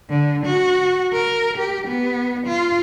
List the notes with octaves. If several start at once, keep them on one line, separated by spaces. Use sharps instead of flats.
D3
F#4
A#4
G4
B3
F4